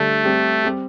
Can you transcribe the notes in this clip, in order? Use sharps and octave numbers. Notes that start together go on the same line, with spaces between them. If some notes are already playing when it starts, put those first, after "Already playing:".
Already playing: D3 G3 A3 D4 A4
G3 C4 G4
G3 C4 G4